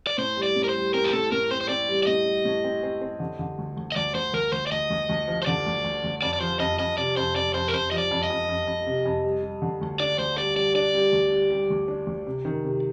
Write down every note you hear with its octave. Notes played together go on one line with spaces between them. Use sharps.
D5
A2 C5
G3
D5
A2
A#4
C5
G3
C4 A#4
G4
A2 A4
A2 A#4
C4 C5
C5
C4 D5
G3
D5
A2 D#5
G3
A2
C4
C4
C4
D3
D3
D2
D2
D#5
D2 D5
D2 C5
D2 A#4
D2 C5
D5
D2 D#5
D2
D2
F3
C5
D3 D5
D2
D2
D2
F2 D5
D5
F3 C5
F2 D#5
F2 D#5
C3 D5
F2 C5
F2 D5
F2 C5
A#4
F2 C5
F3 D#5
D5
F2
D#5
F2
F2
F2
C3
F2
G3
G3
D3
D2
D4 D5
D2 C5
G3 D5
G3 D5
D4 D5
G3
D2
G3
G3
D2
D4
D2
C3
D#3
C3